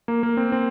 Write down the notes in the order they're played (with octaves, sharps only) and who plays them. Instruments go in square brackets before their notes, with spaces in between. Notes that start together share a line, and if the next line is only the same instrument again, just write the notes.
[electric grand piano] A#3
A#3
C4
C4